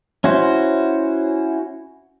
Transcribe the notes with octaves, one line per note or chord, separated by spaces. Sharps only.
C#4 E4 F#4 C5